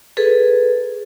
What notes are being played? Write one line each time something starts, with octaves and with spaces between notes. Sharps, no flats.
G#4 A4 B4